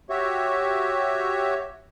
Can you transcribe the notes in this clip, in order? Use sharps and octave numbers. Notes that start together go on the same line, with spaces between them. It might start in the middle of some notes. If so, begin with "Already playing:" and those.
F#4 G4 C#5 E5